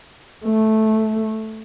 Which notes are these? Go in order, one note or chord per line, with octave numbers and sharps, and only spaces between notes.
A3